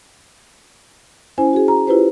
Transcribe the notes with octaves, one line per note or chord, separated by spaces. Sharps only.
C#4 E4 C5 G#5
F#4 G#4
A#5
E4 F4 G4 B4 C5